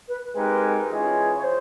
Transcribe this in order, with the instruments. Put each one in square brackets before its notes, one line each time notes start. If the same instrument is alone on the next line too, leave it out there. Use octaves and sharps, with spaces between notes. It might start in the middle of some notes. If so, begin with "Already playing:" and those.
[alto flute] B4
[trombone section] G#3 C4 D#4 G4 A#4 [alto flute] B4
[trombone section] E3 G#3 C#4 F4 G#4
[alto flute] C#5
C5